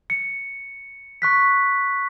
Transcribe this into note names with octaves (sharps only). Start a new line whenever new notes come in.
C#7
C#6 F#6 B6